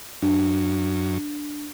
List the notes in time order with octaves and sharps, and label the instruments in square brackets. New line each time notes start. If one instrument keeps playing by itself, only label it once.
[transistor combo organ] F#2 [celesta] D4